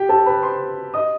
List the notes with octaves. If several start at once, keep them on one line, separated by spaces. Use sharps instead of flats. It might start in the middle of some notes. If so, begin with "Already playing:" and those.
Already playing: G4 G5
A4 A5
B4 B5
C5 C6
D#5 D#6